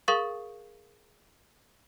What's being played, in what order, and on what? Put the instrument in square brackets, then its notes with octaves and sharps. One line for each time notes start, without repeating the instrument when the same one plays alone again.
[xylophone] G#4 A#4 F5 C#6 D#6 A6